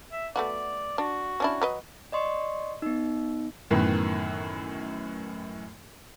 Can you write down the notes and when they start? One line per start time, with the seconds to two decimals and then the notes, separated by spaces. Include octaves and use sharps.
0.12 E5
0.36 A3 B3 F#4 D5
0.98 D4 F#4
1.40 C#4 D4 E4
1.62 F#3 B4 D#5
2.12 D5 D#5 C6 C#6
2.82 B3 D#4
3.71 F#2 A2 D#3 E3 B3